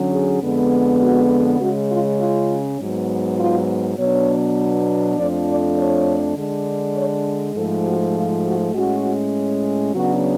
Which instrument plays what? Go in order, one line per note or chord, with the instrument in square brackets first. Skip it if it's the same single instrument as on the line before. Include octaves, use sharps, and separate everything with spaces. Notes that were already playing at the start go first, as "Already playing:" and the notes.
Already playing: [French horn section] D3 F#3 C#4
G#4
F2 D3 G#3 B3
F#4
C#3 G#3 C#4 F#4
F4
F4
G#2 F#3 B3
F4
B2 F#3 B3 D4 C#5
F2 F3 A3 D4 D5
D5
C#5
D3 G#3 D4
C#5
G#2 F3 A3 A4
F#4
F4
F#4
A2 G#3 C#4 F#4
C#3 F#3 B3 D4 F#4